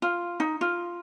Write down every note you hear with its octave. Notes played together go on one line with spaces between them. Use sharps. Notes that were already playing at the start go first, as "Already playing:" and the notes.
F4
D#4
F4